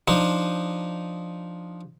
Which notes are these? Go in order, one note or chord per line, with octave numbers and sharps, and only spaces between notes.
F3 D4 D#4